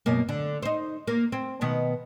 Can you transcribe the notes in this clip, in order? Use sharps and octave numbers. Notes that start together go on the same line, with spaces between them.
F#2 B2 A#3
D3
D#4 C5
A#3
C4
B2 D#3 B3